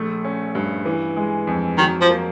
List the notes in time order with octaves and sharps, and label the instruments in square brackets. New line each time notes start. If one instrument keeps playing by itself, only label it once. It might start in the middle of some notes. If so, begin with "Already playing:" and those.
Already playing: [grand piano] A#1 A3
C#4
G2
E3
G#3
F2
[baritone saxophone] D#3 [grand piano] F#3
[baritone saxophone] F3
[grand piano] A#3